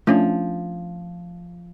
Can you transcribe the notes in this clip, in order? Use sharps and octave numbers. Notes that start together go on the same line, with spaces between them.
F3 A3 C#4 D4